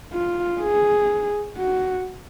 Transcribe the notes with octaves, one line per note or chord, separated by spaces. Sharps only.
F4
G#4
F#4